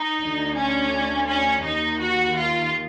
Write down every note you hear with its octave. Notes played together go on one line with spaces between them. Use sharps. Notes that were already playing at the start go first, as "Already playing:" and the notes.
Already playing: D#4
D2 D3
C#4
C#4
D#2 D#3 D#4
F#4
F4